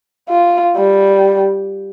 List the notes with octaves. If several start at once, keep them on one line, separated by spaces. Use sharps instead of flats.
F4
G3